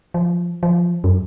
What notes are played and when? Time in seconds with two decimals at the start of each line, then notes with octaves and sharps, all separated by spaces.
0.14 F3
0.63 F3
1.04 F#2